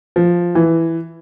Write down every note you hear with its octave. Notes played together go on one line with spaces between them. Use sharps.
F3
E3